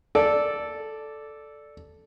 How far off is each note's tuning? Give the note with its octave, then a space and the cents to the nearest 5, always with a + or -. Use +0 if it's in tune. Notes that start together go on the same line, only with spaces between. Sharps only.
A4 -5 D5 +0